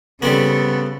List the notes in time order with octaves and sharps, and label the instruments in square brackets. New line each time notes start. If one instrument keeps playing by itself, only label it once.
[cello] C#3 A4 [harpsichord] G3 C4 F#4 [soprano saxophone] B3